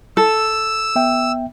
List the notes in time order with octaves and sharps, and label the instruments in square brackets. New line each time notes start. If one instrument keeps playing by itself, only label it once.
[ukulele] A4 [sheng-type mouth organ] E6
[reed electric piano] B3 E5 G5